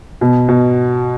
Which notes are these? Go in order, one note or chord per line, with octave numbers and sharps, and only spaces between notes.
B2
B2